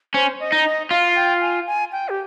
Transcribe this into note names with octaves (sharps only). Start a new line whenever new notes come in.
C#4 C5
D#5
D#4
D#5
F4 F5
G5
G#5
G#5
G5
G4